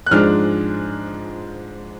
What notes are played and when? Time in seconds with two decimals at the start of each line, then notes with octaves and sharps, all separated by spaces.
0.06 F#6
0.11 G#2 F3 G#3 D4 F6